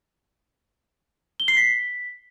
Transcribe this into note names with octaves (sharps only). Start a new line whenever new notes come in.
G7
C7
B6